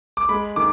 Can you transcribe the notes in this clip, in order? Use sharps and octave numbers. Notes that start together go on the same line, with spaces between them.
D6
G#3 B5
D#3 D6